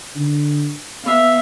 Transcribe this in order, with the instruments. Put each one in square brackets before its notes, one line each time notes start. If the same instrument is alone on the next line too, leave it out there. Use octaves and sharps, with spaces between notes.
[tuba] D3
[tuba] B3 [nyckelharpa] E5 F5